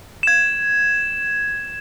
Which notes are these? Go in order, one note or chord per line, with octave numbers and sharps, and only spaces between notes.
G#6 E7